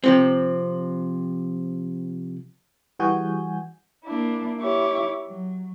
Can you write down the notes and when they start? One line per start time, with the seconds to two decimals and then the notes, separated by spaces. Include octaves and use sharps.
0.04 C3 F3 C4
2.99 E3 G3 F#4 G#4 G#5 G6
4.04 A#3 D4 E4
4.58 E4 G4 C#5 D6
5.25 F#3